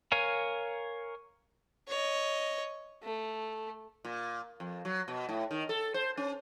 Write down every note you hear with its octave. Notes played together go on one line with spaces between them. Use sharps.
A#4 C#5 F5 G#5 A#5
C#5 D#5
A3
A#2
F2
F#3
B2
A2
D#3
A4
C5
C#4